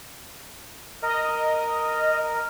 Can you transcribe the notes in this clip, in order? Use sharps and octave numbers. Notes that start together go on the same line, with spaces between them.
A#4 D#5